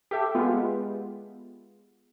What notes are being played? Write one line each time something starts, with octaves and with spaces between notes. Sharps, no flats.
G4 A4 E5
G#3 B3 F4